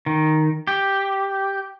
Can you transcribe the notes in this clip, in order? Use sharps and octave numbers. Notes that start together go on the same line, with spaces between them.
D#3
G4